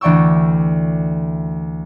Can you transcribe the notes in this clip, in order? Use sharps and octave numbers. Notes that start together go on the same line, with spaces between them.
D2 E3 D5 G5 C#6 E6